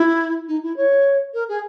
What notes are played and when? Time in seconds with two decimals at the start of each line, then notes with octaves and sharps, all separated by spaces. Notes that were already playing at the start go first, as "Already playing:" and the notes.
Already playing: E4
0.48 D#4
0.62 E4
0.76 C#5
1.33 A#4
1.48 G#4